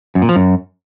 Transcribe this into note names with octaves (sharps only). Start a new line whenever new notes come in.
F#2
A#2
F3
F#2